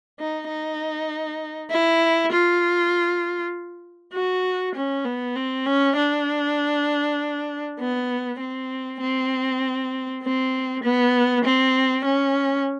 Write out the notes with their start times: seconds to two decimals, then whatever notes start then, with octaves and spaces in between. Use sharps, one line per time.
0.19 D#4
0.48 D#4
1.70 E4
2.32 F4
4.13 F#4
4.75 C#4
5.05 B3
5.36 C4
5.66 C#4
5.96 D4
7.79 B3
8.40 C4
9.00 C4
10.22 C4
10.83 B3
11.44 C4
12.05 C#4